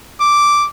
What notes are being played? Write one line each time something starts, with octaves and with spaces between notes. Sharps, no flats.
D6